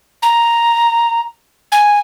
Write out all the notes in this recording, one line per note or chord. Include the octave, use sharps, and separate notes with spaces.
A#5
G#5